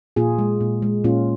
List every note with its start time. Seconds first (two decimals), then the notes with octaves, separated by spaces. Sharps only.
0.16 A#2 F4 G#4
0.38 G#3
0.61 A#2
0.82 G#3
1.04 A#2 C#4 F4